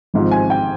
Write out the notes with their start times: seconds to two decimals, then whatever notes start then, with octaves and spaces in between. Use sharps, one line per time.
0.14 G#1 G#2 F3 C4
0.31 G#5
0.50 G5